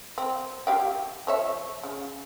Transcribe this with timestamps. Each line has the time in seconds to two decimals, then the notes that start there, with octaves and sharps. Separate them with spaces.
0.18 C4
0.67 G4 F5 G5
1.27 F3 C#5 E5
1.83 C#3